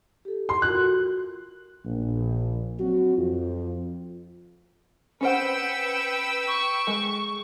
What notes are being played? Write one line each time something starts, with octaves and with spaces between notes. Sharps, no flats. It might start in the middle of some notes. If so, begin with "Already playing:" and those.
G4 A4
C6
F4 F#4 A#4 F#6
A#1
F#3 C4 F#4
F2 F4
C#4 B4 C5 F#5 G5 E6 C#7
C#6
G#3